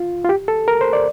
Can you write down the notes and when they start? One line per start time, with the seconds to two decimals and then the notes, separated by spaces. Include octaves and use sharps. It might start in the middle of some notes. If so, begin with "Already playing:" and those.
Already playing: F4
0.24 F4
0.29 G4
0.48 A4
0.68 A#4
0.81 C5
0.93 D5